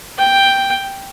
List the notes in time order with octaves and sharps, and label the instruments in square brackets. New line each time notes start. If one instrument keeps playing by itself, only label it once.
[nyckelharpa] G5